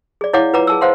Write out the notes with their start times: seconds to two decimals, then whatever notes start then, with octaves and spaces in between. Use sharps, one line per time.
0.21 G#4 D5
0.33 E4 C#5 F5 F#5 D6
0.53 F4 B4 F#5 A#5 D6
0.67 G#4 A5 E6
0.81 C5 F5 F#5 C6